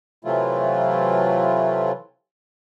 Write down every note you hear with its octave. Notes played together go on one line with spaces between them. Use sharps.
C3 E3 F#3 A3 E4 F4